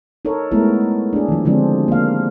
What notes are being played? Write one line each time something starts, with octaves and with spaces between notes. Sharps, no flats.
D#4 A4 A#4 C#5
G#3 A3 B3 E4 A#4
D4 G#4
D#3 F3
D3 F3 G3 G#3 C4 D4
A#3 F5